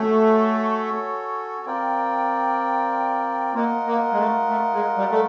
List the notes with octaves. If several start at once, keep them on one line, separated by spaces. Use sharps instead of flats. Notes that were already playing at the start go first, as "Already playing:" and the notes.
Already playing: A3 C#4 F#4 A4 C#5
C4 F4 A#4 D5 G5
A#3 F4 A#4 D#5 F#5
A#3
G#3
A3
A3
G#3
G3
A3